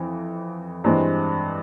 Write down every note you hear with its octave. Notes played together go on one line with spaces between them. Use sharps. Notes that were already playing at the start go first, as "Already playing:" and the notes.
Already playing: F2 E3
G2 E3 G#3 C4